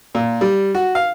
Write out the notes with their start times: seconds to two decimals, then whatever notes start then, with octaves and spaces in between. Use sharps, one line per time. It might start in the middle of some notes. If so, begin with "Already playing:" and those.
0.15 A#2
0.41 G3
0.75 F#4
0.95 F5